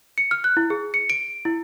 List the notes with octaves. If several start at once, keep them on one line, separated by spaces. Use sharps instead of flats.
C#7
F6
F#6
E4
G#4
C#7
D7
E4